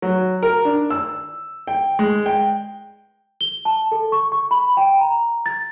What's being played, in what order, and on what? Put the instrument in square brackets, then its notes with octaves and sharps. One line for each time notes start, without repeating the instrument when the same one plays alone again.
[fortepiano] F#3
A#4
D4
E6
G5
G#3
G5
[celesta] G7
A5
A4
C#6
C#6
B5
G5
A#5
A6